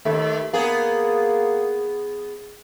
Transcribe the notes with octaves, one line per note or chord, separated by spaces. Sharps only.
D#2 A3
A#3 B3 G#4